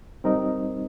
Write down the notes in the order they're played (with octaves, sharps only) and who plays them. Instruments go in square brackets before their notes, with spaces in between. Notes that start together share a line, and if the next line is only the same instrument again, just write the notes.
[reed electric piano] G3 C4 D#4 A#4 D#5